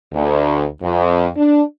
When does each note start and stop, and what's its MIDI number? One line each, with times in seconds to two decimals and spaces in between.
0.14 0.65 38
0.82 1.28 41
1.36 1.61 62